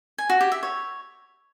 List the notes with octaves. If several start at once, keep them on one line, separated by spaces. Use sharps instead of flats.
G#5
F#4
G4
E5
C#5